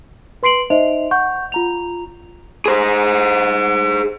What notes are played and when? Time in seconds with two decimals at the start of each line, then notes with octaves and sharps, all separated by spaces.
0.43 B4 C6 C7 D7 F#7
0.70 D#4 C5 D#5 E5 F7
1.11 F#5 C#6 G6
1.52 F4 A#5 F7
2.66 G#4 C5